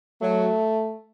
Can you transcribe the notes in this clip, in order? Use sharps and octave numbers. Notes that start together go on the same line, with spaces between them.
F#3 A3